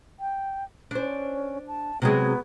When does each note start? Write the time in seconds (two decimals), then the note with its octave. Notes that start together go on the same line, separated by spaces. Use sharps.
0.20 G5
0.91 C#4 D4 C5
1.68 A5
2.02 C3 F#3 G#3 B3